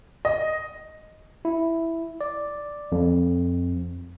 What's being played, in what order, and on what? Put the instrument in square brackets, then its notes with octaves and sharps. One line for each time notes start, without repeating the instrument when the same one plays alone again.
[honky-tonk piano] D#5
[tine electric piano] E4
D5
F2